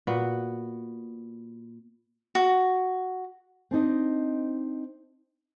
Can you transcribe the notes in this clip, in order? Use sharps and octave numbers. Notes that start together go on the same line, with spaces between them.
A#2 B3 F#4
F#4
C4 D4 D#4 D#5